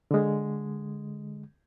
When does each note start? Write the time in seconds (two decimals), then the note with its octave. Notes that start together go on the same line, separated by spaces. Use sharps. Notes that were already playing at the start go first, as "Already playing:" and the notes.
0.11 D3 G#3